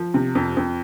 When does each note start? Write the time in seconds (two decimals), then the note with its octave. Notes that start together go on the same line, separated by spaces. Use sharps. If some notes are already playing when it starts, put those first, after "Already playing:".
Already playing: F3
0.14 C3
0.35 F2
0.57 F2